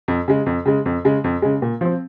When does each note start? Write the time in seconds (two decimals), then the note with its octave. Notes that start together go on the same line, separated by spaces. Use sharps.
0.08 F2
0.28 C#3 G#3
0.46 F2
0.65 C#3 G#3
0.86 F2
1.05 C#3 G#3
1.24 F2
1.42 C#3 G#3
1.62 A#2
1.81 F3 C4